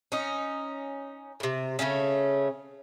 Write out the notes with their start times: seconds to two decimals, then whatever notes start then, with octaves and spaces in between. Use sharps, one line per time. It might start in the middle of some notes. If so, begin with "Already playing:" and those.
0.12 C#4 D#4
1.40 A2 C3
1.79 C#3 F#3 A3 C#4